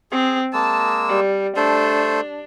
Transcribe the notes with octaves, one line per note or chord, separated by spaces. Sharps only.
C4 G#4
G#3 A#3 A5 E6
G3
A3 D4 A4 C5